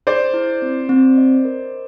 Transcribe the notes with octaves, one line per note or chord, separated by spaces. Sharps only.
G#4 C5 D5
E4
C4
C4
D#5
A#4